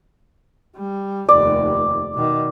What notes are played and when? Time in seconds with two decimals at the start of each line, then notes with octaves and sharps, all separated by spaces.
0.77 G3
1.29 F1 D#2 D5
2.14 B2 D#3